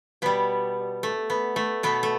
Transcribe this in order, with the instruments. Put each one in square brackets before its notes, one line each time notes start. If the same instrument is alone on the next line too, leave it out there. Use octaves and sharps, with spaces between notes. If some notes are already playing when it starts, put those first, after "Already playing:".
[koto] B2 G3 B3
A3
B3
A3
B2 A3 B3
A3